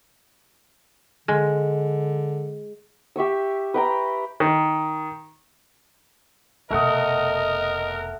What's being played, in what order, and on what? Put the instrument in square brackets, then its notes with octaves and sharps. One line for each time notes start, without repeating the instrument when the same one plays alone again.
[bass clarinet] D3 [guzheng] G#3
[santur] G4 E5 C#6 E6
B4 G5 A#5
[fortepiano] D#3
[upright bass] F1 B2 [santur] A3 F#5 D#6 [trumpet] A#4 [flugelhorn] D#5